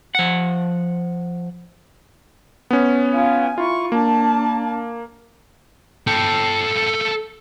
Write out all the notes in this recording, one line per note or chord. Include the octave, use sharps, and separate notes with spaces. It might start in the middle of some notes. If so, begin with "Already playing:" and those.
F3 F#5
B3 C#4
F4 G#5
E4 F4 C#6
A#3 D4 A5
A4 G5